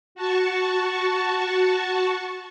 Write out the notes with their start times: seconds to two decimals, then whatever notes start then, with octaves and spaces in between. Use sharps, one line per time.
0.15 F#4 A5 C#6